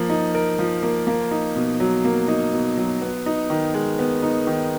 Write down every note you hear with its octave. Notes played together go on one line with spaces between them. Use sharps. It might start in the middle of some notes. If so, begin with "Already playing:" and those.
Already playing: F3 A#3 A#4
D#4
A#4
F3
A#3
A#3
D#4
B2
F#3
A#3
D#4
B2
F#3
B3
D#4
D#3
G#3
B3
D#4
D#3